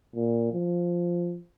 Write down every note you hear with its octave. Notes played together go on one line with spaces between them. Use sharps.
A#2
F3